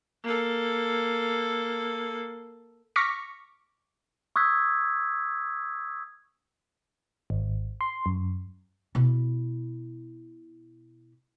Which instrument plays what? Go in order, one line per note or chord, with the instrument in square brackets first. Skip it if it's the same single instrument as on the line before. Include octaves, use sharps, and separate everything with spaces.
[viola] A#3 A4
[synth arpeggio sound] C#6 D6 F6 A#6 B6 C#7
[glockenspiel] C#6 D#6 E6 F#6 G#6 B6
[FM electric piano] G#1
C6
F#2
[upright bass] B2 E4